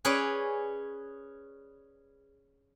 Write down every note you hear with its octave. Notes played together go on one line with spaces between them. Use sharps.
C#4 G#4 B4 C#5 D5